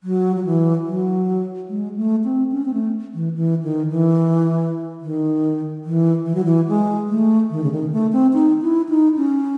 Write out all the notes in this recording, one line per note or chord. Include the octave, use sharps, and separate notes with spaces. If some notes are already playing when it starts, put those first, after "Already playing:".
F#3
F#3
E3
F#3
G#3
A3
C4
C#4
C4
A3
E3
E3
D#3
E3
D#3
E3
E3
F#3
E3
G#3
A3
D#3
C#3
D#3
A3
C4
D#4
E4
D#4
C#4